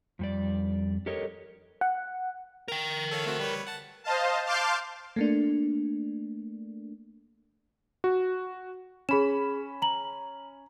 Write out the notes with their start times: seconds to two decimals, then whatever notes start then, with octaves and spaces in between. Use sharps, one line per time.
0.19 F2 G3 D5
1.06 G4 A4 A#4 C#5 D#5
1.81 F#5
2.68 A#4 G5 A#5
3.11 A4 C#5 F5
3.26 A3 C4 F#4
3.39 G3 B4 C#5
3.67 F#5 A5
4.04 C5 D#5 F5 A5
4.45 F5 A5 C6 D6 F6 G6
5.16 A3 A#3 D4
8.04 F#4
9.09 C#4 G#4 B5 E7
9.82 A#5 F#7